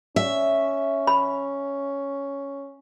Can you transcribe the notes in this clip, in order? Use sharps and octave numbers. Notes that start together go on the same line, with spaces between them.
C#4 E5
B5